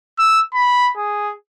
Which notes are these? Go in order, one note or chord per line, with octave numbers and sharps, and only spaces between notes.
E6
B5
G#4